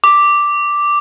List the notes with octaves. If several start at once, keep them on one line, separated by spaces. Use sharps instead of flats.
D6